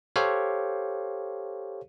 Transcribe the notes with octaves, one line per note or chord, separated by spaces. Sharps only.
G4 A4 C5 C#5 F5